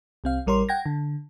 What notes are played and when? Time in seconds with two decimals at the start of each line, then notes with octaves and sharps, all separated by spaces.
0.24 C2 C4 F5
0.46 A1 G3 A#4 C#5 C6
0.69 F#5 G5 G#6 A#6
0.86 D3